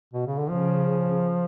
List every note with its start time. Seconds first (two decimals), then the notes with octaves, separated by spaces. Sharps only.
0.13 B2
0.26 C#3
0.38 D3
0.50 C#3 F3